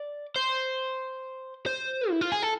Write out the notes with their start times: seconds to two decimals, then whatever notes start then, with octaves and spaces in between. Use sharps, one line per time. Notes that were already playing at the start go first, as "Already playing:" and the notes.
Already playing: D5
0.36 C5
1.66 C5
2.10 E4
2.21 F4
2.32 G#4
2.42 A4